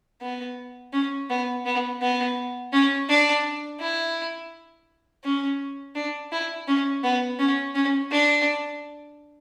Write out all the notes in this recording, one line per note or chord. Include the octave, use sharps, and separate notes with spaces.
B3
C#4
B3
B3
B3
C#4
D4
E4
C#4
D4
E4
C#4
B3
C#4
C#4
D4